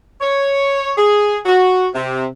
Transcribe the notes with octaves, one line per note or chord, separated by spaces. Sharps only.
C#5
G#4
F#4
C3